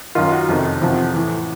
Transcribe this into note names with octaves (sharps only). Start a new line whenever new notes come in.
F#2 D#3 F4
F#4
F2 C3 D#3
E2 C3 F3
A2 E3